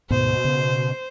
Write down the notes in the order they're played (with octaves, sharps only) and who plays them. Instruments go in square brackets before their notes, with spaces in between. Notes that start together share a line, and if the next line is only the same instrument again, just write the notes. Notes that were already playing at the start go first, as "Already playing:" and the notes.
[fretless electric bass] D2 G#2 B3 [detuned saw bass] B2 [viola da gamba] C5
[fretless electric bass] C#3